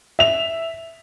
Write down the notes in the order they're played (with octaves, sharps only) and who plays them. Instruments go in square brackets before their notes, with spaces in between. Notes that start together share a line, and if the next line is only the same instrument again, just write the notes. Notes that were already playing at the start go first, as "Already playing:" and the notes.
[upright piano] E5 F7